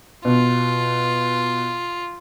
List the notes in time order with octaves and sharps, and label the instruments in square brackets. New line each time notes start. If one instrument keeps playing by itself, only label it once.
[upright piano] B2 [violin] F4